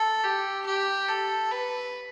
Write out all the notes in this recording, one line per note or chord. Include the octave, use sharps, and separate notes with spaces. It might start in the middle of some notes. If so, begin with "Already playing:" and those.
Already playing: A4
G4
G4
A4
B4